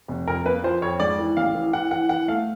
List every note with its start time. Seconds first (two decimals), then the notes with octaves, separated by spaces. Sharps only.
0.08 F1
0.28 F2 A#4
0.46 A#3 B4
0.64 F3 C5
0.82 F2 C#5
1.00 G#2 D5
1.18 E3
1.37 A1 F5
1.55 E3
1.73 E3 F#5
1.91 E3 F#5
2.09 E3 F#5
2.28 A3 F5